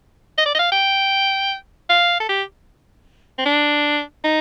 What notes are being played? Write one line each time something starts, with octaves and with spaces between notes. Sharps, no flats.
D#5
D5
D#5
F5
G5
F5
A4
G4
C4
D4
D#4